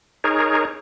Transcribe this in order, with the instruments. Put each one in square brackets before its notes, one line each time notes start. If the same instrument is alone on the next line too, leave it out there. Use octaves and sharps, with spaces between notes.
[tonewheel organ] D#4 G#4 A#4 C#5